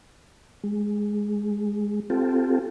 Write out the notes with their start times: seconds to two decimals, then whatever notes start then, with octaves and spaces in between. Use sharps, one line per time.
0.64 G#3
2.10 C4 F4 G4 A4